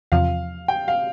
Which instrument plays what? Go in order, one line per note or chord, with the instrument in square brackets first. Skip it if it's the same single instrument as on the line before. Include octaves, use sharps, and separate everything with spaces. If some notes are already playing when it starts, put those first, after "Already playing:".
[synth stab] E2 C3 F3 [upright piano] F5
[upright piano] G5
F5